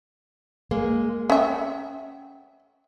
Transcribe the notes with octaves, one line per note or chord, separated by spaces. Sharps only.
G#3 A#3
C#4 E5 F#5 G5